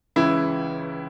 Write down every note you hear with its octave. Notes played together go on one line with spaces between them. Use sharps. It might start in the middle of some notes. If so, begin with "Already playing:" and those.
C#2 C#3 E3 E4